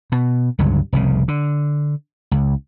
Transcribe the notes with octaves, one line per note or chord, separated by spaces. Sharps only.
B2
C#2 G2 D3 F#3
F1 C2 C#3
D3
C#2